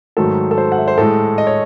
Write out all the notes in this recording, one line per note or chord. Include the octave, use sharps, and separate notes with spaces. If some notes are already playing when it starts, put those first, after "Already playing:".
G#2 D#3 F#3 A3 A4
A4
C5
F#5
E5
C5
A2 G#3 A4
D#5
C#5